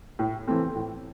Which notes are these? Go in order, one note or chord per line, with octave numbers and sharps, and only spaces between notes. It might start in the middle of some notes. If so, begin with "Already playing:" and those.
A2
E3 A3 C4
A2